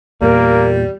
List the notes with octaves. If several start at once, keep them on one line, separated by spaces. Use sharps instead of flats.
E2 A#2 G3 A#3 A#4